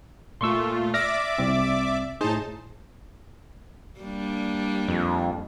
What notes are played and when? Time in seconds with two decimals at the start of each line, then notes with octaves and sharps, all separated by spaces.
0.41 A#2 A3 F4 C6 C#6 E6
0.94 D5 E5 D6 F6 A#6
1.38 C2 C4
2.21 A2 D#4 G#4 C5 A5
4.01 G3 A#3 D4
4.88 F2